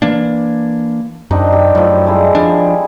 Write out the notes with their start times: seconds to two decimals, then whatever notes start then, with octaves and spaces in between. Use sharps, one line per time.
0.02 E3 A#3 D4
1.31 F#2 C4 D4 D#4
1.52 G4
1.75 F#2 A2 F3
2.06 G3 G#3 E4
2.35 F3 D4